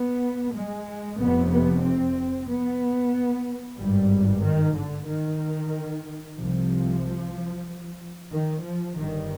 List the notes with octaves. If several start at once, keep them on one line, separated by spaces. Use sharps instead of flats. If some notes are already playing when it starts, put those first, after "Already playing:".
Already playing: B3
G#3
F1 F2 C3 B3
B3
C4
B3
G#1 G2 G3
D#3
D3
D#3
C2 C3 F3
D#3
F3
G1 G2 D#3